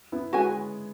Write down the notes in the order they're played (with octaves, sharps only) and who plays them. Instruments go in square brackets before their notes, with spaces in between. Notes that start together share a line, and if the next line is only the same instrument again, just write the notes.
[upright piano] B3 E4
[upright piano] G#3 C#4 [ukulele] F#4 B4 G#5